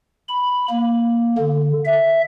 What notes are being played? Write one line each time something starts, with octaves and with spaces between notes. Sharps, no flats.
B5
A#3
D3
E5